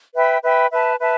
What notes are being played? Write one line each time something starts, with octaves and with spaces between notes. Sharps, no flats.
B4 E5 G5 B5
B4 E5 G5 B5
B4 E5 A5
B4 E5 A5